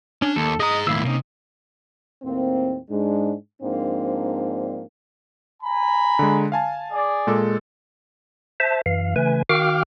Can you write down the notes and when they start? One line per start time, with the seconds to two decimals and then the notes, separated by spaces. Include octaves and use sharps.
0.22 C#4 D4
0.36 D#2 A4
0.60 G#4 D#5 A#5 D#6
0.87 D#2 A2 E4 F5 E6
1.05 C3 A#3 C#4 D#4
2.23 D#2 A2 A#3 C4
2.89 G#2 G#3 D4
3.62 G#2 F3 A#3 C4 D4
5.63 G#5 A#5 B5
6.19 D3 G#3
6.52 F5 G#5 A5
6.91 G#4 D5
7.27 A#2 G#3 A4
8.60 C5 E5 A5
8.86 F#2 E3 F5
9.16 C#3 E3 A3 B4 G#5
9.49 D#3 F#4 F5 G5 D6 F6